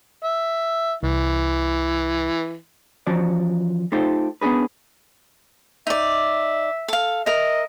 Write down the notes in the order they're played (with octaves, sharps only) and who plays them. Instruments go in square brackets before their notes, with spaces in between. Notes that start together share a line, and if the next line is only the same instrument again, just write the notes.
[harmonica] E5
[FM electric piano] C2 [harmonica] E3
[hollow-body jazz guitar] E3 F3 C#4 F#4 D5
A3 D#4 F4 G4 A4 C5
B3 C#4 D4 G#4 B4
[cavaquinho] D#4 D5 [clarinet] E5
[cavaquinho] A4 F5
[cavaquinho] A#4 E5 [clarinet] D#5